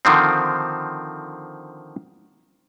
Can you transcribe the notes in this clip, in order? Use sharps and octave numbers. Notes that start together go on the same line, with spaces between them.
D3 D#3 F3 C4